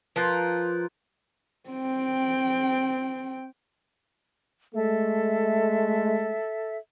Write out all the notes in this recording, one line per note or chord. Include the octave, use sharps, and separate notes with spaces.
F3 F4 A#4 B4 F#6 G6
C4 G5
G#3 A3 A4 E5